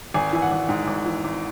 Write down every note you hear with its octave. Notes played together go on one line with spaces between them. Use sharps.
G#1 G#5
E3 G#5
F#5
G#1
G#2
G#1
E3
G#1